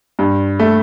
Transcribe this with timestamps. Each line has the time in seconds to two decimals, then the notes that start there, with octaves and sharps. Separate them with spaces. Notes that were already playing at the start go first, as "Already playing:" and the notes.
0.19 G2
0.60 A3